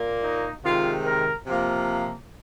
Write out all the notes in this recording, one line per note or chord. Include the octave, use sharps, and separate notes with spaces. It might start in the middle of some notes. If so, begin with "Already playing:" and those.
Already playing: A#2 A#3
D#4
C3 D#3 G#3 F4
A#4
C3 F3 A#3 F4